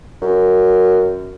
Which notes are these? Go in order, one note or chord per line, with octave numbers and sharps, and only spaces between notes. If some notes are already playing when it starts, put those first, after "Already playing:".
F#2